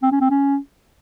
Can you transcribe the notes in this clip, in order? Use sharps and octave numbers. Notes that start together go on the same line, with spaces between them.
C4
C#4
C4
C#4